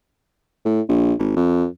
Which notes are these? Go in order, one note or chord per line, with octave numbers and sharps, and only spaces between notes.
A2
A#1
G#1
F2